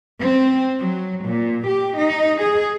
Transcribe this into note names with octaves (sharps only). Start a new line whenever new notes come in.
C4
F#3
A#2
G4
D#4
G#4